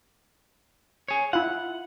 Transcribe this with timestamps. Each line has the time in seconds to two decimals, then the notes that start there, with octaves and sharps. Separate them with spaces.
1.08 G#4 C#5
1.33 E4 F4 F#5